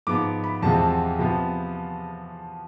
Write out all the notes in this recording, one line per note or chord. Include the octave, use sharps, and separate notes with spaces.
G#2 F3 B3 D6
B5
E2 C3 F3 G#3 C4 A5
C3 F3 B3